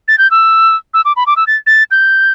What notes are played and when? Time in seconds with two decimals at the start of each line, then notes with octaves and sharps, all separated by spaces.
0.08 A6
0.18 G6
0.31 E6
0.94 E6
1.05 D6
1.16 B5
1.27 D6
1.37 E6
1.47 A6
1.67 A6
1.91 G6